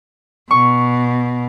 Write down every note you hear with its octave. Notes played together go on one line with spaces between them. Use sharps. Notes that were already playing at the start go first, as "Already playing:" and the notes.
B2 C#6